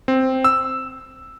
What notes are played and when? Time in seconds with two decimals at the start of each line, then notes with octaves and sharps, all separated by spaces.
0.08 C4
0.44 E6